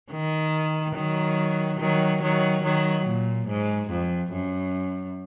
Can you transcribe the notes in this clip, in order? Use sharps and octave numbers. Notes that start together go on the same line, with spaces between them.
D#3
D#3 F#3
D#3 F#3
D#3 F#3
D#3 F#3
A#2
G#2
F2
F#2